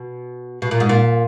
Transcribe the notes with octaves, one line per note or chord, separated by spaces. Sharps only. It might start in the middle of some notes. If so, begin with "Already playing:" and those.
Already playing: B2
B2
A#2
G#2
A#2